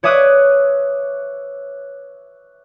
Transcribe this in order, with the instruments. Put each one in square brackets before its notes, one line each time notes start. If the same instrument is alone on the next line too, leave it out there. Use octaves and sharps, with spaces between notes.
[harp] B4 C#5 E5 D6 D#6 F#6